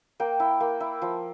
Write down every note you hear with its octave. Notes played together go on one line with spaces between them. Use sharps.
A#3 G5
E4
A#3
E4
F3